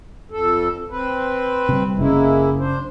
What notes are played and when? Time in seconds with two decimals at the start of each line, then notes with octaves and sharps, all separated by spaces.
0.31 F2 A4
0.90 C4 B4
1.69 C3 G3
1.97 F#1 G#3 A#3 C#4 E4
2.60 D4 C5